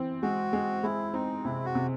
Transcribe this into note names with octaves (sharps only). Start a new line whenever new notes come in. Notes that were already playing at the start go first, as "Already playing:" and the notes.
Already playing: E3 C4
G#3 F#4
G#3
G#3 E4
C4 D#4
C3 E4
F#4
C3